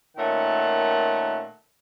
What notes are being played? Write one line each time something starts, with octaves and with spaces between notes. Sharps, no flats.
A#2 D#3 A3 C#4 F#5